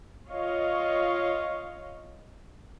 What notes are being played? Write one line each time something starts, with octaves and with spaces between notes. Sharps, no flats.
F4 C#5 D#5 F5